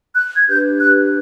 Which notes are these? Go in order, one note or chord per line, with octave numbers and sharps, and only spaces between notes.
F#6
G#6
D4 G4 B4 G6
F#6